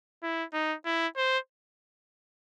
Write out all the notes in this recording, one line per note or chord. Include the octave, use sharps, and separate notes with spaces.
E4
D#4
E4
C5